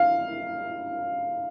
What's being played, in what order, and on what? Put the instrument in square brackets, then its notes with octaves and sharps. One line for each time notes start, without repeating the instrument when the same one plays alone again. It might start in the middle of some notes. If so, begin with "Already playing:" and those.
Already playing: [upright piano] F5